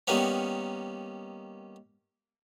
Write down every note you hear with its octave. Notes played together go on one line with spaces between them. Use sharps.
D#3 G3 A#3 B3 C#4